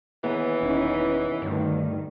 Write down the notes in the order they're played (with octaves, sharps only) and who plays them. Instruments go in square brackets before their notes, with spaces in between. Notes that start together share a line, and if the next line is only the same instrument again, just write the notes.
[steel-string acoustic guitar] D#2 B3 G#4 [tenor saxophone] E3
[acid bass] E1 [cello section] C#4 D#4 E4
[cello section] D2 D#3 [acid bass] G2